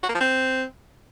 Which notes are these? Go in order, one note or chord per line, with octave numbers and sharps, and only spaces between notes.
F#4
A#3
F3
C4